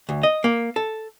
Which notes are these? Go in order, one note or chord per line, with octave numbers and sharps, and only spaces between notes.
D2
D#5
A#3
A4